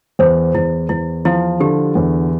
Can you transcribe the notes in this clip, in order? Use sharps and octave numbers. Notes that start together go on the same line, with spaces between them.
E2 C5
E2 E4
E2 E4
F3 E4
D3 G4
E2